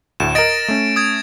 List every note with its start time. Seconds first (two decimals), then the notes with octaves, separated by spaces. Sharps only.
0.20 D2 A2 E7
0.35 A#4 D#5 A6 A#6 D7
0.68 A3 C#4
0.96 D#6 G#6